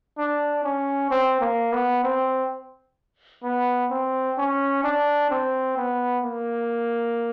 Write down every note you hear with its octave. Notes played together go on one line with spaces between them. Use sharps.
D4
C#4
C4
A#3
B3
C4
B3
C4
C#4
D4
C4
B3
A#3